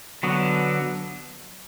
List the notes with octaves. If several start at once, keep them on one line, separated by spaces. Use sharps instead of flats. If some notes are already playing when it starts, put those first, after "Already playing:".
D3 F#3 B3